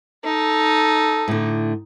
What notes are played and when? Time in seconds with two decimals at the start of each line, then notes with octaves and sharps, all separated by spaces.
0.25 D#4 A4
1.28 A2 D3